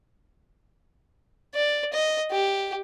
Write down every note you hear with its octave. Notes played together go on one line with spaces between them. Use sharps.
D5
D#5
G4